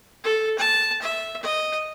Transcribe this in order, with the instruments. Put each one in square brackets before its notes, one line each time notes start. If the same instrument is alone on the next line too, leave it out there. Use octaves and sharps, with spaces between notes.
[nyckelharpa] A4
A5
E5
D#5